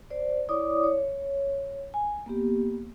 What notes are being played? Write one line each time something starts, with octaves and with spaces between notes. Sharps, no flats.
C5 D5
E4 C#5 D5 D6 D#6
C#5
G#5
A#3 B3 G4